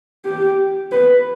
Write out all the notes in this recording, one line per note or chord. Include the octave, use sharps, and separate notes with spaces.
G4
B4